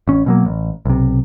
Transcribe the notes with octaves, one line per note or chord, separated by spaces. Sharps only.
A1 C#4
B2 F#3 A#3
A1
B1 C3